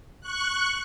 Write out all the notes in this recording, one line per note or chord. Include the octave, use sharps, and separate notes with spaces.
C#6 F#6